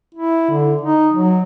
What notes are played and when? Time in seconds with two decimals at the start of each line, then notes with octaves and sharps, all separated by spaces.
0.15 E4
0.50 D3
0.81 D#4
1.13 F#3